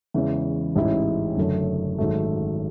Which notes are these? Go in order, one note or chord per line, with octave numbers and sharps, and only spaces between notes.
E2 C#3 E3 G#3
A1 G#2 G#3 C#4 E4
F#1 F#2 D3 A3
G#1 G#2 F#3 A3